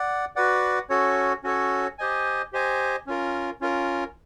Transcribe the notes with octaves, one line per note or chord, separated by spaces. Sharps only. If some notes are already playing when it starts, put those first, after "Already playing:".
Already playing: D5 F#5
F#4 B4 D5 F#5
C#4 F#4 A4 C#5
C#4 F#4 A4 C#5
G4 C5 D#5 G#5
G4 C5 D#5 G#5
C#4 F4 A#4
C#4 F4 A#4